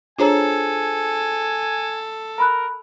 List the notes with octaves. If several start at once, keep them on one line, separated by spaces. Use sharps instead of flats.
D4 F4 G#4 A4 C5 C#5 G#5 A#5
A#4 A#5 B5 F#6